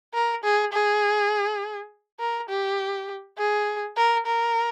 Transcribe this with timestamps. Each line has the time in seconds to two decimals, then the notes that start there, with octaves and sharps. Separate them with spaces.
0.14 A#4
0.44 G#4
0.73 G#4
2.20 A#4
2.49 G4
3.38 G#4
3.97 A#4
4.26 A#4